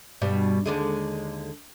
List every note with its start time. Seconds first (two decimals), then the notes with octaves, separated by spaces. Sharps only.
0.22 G2 B2 G3
0.66 D#2 D3 G#3